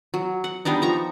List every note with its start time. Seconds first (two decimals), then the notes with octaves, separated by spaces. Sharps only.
0.14 F#3
0.44 F#5
0.65 G3 B3 D4 D#4
0.82 F3 A#5 C#6